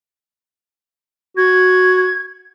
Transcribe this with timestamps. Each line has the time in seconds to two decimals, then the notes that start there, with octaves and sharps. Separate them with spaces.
1.37 F#4 G#6